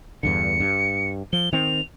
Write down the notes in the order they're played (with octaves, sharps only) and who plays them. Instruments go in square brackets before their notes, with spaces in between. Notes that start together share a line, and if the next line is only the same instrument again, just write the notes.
[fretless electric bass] E2 G2 D3 [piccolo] C#7
[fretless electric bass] G2
[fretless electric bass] F3 [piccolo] G7
[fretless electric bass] D#3 C4 [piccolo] F7